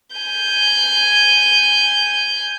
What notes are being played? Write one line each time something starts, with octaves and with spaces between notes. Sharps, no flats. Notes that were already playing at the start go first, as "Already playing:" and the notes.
G#5 G6